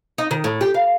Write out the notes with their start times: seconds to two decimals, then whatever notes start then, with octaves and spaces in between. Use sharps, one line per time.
0.18 D#4
0.31 D#3
0.44 A2
0.61 G4
0.74 F5